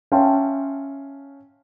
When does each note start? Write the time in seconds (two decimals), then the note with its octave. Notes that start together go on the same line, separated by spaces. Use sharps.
0.12 C#4 E5 F5 G5 A5 C6